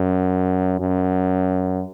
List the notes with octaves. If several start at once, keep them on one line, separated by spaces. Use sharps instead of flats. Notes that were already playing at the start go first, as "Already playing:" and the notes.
Already playing: F#2
F#2